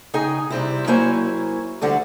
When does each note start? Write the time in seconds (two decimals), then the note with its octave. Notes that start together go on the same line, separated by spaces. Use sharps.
0.14 C#3 D#4 G#4 G5 G#5
0.50 C3 G3 C4 E4
0.87 F#3 A#3 E4 C5 C#5 G#5
1.81 D2 D3 G3 F#5